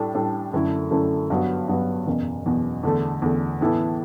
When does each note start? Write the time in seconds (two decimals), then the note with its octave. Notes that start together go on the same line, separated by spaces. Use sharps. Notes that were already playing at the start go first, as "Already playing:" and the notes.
Already playing: A2 G3 D4 A4
0.15 A2 G3 D4 A4
0.53 F#2 D3 A3 E4
0.91 F#2 D3 A3 E4
1.30 G2 F#3 B3 F#4
1.68 G2 F#3 B3 F#4
2.07 F#1 E2 B2
2.45 F#1 E2 B2
2.83 E2 D3 A3
3.22 E2 D3 A3
3.61 A2 E3 B3 E4 A4